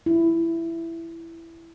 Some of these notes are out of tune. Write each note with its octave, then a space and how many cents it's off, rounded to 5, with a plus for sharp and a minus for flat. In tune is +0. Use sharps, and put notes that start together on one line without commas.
E4 +10